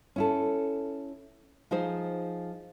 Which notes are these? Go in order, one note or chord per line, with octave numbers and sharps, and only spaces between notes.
C#4 E4 A4
F3 D#4 G#4 C5